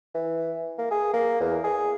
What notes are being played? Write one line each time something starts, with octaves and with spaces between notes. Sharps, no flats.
E3
A#3
G#4
A#3
E2
G#4